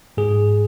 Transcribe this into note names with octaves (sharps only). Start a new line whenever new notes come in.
G#2 G#4